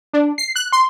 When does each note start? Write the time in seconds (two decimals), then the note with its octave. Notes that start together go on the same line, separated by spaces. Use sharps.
0.13 D4
0.38 C7
0.56 F#6
0.72 C6